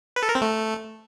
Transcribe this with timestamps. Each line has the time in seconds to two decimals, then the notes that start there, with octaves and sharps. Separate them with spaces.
0.16 B4
0.23 A4
0.29 A#4
0.35 C4
0.41 A3